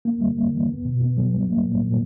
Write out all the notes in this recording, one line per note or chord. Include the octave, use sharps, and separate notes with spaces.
A#3
G3
A#3
E3
B3
B2
B3
F#3
G3
A#3
A#2
A#2